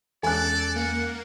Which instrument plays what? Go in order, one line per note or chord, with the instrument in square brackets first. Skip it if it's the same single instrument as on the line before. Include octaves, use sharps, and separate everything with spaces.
[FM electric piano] E2 G#3 C#4 [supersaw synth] A4 [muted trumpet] D5 [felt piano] G#5 F#6
[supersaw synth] A#3 [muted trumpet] F#5